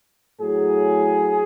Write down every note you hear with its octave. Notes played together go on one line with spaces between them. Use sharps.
A2 F#3 G#4